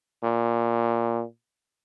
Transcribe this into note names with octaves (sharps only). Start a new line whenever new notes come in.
A#2